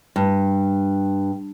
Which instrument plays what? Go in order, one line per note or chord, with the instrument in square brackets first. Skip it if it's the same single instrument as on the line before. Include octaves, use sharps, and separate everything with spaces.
[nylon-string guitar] G2